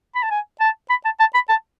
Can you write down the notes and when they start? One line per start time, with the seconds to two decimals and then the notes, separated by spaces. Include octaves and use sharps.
0.15 B5
0.23 A5
0.31 G#5
0.60 A5
0.90 B5
1.05 A5
1.20 A5
1.34 B5
1.49 A5